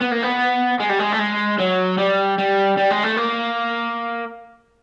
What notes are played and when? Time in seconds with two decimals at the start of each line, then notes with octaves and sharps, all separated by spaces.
0.01 B3
0.11 A#3
0.23 B3
0.80 G#3
0.89 G3
0.99 G#3
1.12 A3
1.19 G#3
1.59 F#3
1.98 G3
2.38 G3
2.77 G3
2.91 G#3
3.04 A3
3.17 A#3